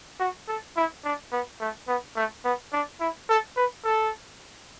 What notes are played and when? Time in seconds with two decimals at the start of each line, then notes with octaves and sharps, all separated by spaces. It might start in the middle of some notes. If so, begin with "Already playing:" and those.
0.20 F#4
0.48 A4
0.77 E4
1.05 D4
1.32 B3
1.61 A3
1.88 B3
2.16 A3
2.45 B3
2.73 D4
3.01 E4
3.29 A4
3.57 B4
3.85 A4